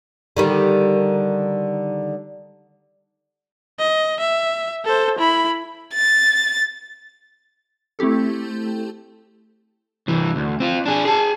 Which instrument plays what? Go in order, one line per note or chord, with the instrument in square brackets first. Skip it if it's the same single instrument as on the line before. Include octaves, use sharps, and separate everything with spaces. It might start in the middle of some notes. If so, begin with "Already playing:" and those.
[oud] D3 D#3 G3
[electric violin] D#5
E5
A4 C5
E4 B5
[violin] A6
[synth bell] A3 C4 E4 G4 A4
[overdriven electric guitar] C2 E3
D2
C4 F4
D4 G#4
G#4 A5